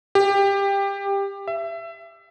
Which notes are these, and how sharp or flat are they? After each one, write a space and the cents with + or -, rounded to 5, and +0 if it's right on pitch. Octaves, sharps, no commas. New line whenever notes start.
G4 +15
E5 +25